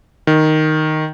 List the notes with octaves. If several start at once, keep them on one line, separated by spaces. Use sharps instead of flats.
D#3